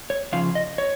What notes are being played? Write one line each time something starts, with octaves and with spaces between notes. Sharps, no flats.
C#5
C#3 F3 C#4 F4 F5
D#5
C#5